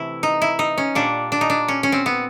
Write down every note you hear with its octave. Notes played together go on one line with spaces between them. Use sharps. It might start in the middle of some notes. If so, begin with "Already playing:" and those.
Already playing: C3 E3 A3 E4
D#4
E4
D#4
C#4
A#2 G3 D4
D4
D#4
D4
C#4
C#4
C4
B3